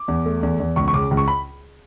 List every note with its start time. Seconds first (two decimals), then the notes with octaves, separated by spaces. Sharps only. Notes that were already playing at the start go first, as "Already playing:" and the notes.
Already playing: D6
0.08 E2
0.26 A3
0.43 E2
0.60 E2
0.76 C#2 C#6
0.88 C#6
0.94 C#3 D6
1.11 C#2
1.17 C#6
1.28 B5